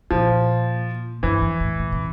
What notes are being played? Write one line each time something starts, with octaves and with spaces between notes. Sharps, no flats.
A#2 F3
G2 E3
F2
A2
A#2
C3